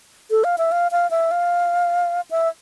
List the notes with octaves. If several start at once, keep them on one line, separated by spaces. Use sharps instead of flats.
A4
F5
E5
F5
F5
E5
F5
E5